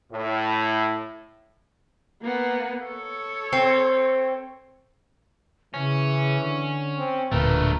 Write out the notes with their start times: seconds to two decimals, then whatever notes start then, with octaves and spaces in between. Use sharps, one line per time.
0.11 A2
2.22 A#3 B3
2.85 A4 C#5
3.53 C4
5.74 C#3 E3 C#4
6.41 D3
6.98 C4
7.32 D1 A#2 D3 A3 A#4 B4